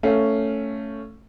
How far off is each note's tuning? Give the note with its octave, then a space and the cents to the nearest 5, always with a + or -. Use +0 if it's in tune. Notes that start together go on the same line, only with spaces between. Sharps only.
A3 +10 C#4 +0 F5 +0